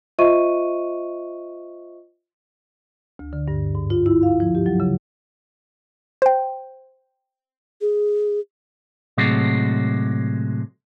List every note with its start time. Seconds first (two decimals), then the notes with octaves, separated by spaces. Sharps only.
0.19 F4 C5 D#5 E5 C#6 D#7
3.19 D2
3.33 D3
3.48 G2
3.75 G#2
3.90 F4
4.06 E4
4.23 F5
4.40 F3
4.55 G4
4.66 F#3
4.80 C#3
6.22 C5 G5
7.81 G#4
9.18 A2 C3 F#3 G#3